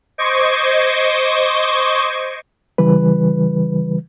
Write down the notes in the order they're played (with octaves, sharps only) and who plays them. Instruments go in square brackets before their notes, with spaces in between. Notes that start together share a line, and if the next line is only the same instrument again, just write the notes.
[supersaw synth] C5 D#5 C#6 D6 G#6
[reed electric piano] C#3 E3 G3 B4